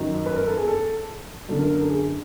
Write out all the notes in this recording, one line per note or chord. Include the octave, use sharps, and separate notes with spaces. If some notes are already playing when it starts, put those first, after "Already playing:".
Already playing: F#2 D#3
B4
A#4
A4
G#4
A4
F#2 D3 A4
A#4
A#4
A4
G#4